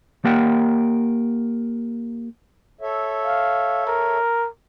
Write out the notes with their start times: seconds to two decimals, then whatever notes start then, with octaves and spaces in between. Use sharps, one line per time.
0.25 A#3 G4 A#4 F#5 G5
2.81 A4 C#5 E5
3.26 F5
3.87 A#4